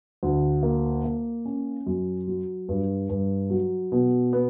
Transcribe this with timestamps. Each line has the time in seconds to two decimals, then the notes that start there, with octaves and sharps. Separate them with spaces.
0.23 D2
0.63 A#3
1.04 A#3
1.46 C#4
1.86 F#2
2.27 F#3
2.69 G2
3.09 G2
3.50 F#3
3.92 B2
4.33 B3